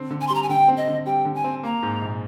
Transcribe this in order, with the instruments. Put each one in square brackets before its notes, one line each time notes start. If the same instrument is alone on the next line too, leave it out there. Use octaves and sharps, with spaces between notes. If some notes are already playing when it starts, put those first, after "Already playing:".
Already playing: [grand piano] D3 C4
D3
[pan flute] G#5
C6
[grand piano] G3 [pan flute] A#5
[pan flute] G#5
[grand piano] D3 [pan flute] G5
[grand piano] C4
[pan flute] D#5
[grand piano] D3
[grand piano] G3 [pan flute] G5
[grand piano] D3
[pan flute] G#5
[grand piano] C4
[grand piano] A#3 [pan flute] A#5
[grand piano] G#2
A#1